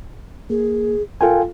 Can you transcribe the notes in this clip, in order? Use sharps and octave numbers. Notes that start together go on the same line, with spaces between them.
A#3 G#4
F4 A4 A#4 F5 G5 G#5